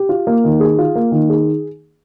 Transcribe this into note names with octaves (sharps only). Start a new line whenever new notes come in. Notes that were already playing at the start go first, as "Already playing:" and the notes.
Already playing: G4
F4
A#3
D#3
G#4
F4
A#3
D#3
G#4